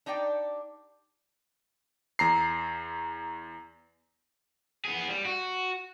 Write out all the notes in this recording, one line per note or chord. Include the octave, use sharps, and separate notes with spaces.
D4 D#4 G4 D5 G5
E2 A#5 C7
B3 G#4
G3
F#4